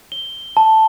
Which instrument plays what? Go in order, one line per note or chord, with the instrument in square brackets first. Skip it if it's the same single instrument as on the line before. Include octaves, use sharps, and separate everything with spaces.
[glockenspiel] G7
A5